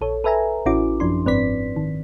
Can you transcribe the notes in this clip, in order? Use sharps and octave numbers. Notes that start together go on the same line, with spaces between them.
A#1 A4 C#5
A4 B4 E5 G#5 A#5
A1 C#4 E4 F#4 D6
F#2 F3 D4 C6
G1 G#2 C4 B4 D5 B6
D#3